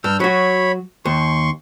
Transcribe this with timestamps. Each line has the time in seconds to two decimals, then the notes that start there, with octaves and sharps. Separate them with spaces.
0.04 G2 E6 F6 G6
0.20 F#3 F#4 C#5 B5
1.05 D#2 C6 C#6